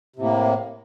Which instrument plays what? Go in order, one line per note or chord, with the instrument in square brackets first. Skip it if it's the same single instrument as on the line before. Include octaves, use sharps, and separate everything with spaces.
[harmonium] C3
A2
A#3